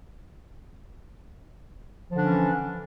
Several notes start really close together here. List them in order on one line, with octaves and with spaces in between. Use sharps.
F3 D3 D4 C#4 E3